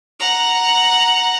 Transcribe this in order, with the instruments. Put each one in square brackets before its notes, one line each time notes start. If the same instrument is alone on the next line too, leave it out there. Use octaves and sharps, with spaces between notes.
[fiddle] F#5 A#5